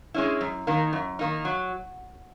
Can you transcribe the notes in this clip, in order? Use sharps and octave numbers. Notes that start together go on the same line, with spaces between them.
G#3 C#4 E4
F#2
D#3 A#3 D#4
F#2
D#3 A#3 D#4
F#3